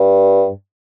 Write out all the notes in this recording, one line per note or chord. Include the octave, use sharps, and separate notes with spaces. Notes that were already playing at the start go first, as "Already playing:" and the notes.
Already playing: G2